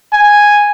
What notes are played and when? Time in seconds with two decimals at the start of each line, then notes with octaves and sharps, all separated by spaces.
0.13 G#5